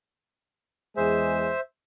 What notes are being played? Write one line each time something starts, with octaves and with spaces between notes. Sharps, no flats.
E2 G#3 G#4 C5 E5